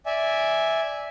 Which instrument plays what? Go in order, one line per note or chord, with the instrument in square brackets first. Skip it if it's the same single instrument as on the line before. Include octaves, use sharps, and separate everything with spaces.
[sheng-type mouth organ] D5 E5 G#5